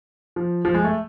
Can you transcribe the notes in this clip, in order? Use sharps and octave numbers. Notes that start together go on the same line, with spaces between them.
F3
F3
G#3
A3